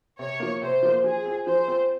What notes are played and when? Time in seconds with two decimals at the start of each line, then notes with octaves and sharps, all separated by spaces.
0.19 C3 C#5
0.40 F3 A#3
0.62 C3 C5
0.83 F3 A#3
1.04 F3 G#4
1.26 C4 F4
1.47 F3 C5
1.68 C4 F4